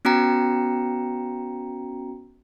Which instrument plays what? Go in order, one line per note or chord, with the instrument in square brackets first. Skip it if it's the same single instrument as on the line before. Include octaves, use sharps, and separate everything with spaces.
[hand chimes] B3 C#4 F#4 G5 A#5 C#7